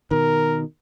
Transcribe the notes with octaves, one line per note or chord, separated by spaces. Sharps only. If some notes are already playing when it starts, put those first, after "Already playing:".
B2 D#3 A#4